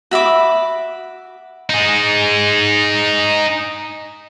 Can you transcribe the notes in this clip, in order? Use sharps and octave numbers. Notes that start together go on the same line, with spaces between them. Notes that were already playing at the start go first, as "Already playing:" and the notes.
F#4 E5 B5 D6
D#4 G#4